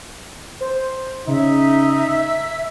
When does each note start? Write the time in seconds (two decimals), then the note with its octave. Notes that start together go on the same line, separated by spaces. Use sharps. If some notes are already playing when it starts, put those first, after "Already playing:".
0.61 C5
1.27 C#3 D#4 E5
2.25 B6